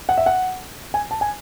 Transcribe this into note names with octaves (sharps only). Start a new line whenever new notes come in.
F#5
E5
F#5
G#5
A5
G#5